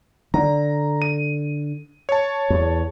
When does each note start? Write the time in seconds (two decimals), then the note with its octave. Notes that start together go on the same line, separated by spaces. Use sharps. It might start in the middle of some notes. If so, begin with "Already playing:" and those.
0.34 D3 A#5
1.02 D#7
2.09 C#5 A5
2.50 E2